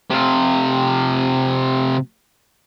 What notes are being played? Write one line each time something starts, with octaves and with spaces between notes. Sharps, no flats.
C3 F4